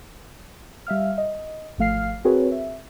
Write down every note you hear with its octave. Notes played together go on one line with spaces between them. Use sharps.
G3 E5 F5 F6
D#5
G#1 F3 A3 F5 F6 C7
C4 F#4 G#4 A#4 B4 C#5
E5